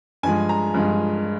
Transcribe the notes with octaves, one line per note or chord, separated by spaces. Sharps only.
G2 F3 G#3 G#5
A#5
G2 F3 G#3